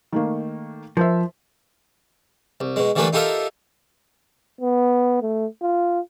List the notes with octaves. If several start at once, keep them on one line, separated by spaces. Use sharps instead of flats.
D#3 A3 A#3
F3 A#4 C5 E5
C2
B2 G#3
D3 E3 G3 A3 A#3 B4
D#4 F4 G4 A4 A#4 E5
B3
A3
F4